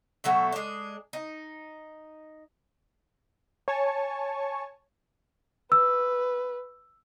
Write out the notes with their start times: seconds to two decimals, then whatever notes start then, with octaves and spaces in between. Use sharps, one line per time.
0.24 B2 F#3 A3 E5
0.52 G#3 D4
1.13 D#4
3.68 C#5 G#5 A5 C#6
5.72 B4 E6